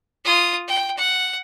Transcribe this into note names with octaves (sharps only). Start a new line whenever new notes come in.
F4 D#6
G5
F#5